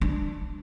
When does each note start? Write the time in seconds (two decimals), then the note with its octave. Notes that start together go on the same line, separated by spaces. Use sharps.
0.01 D4